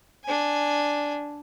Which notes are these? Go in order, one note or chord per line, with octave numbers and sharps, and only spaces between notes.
D4 G#5